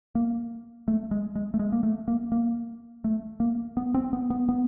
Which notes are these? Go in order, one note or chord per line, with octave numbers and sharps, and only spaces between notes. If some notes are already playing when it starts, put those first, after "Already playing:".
A#3
A3
G#3
G#3
A3
G#3
A#3
A3
A#3
A#3
A3
A#3
B3
C4
B3
B3
B3